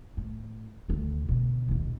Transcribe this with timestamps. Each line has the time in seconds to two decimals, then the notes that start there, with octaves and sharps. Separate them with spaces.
0.17 A2
0.88 D2 D#3
1.29 B2 D3
1.68 D#1 D#2